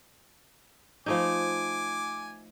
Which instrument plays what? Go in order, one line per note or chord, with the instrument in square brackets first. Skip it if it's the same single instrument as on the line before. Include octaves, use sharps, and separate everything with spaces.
[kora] F3 A3 D#4 [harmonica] G#5 D6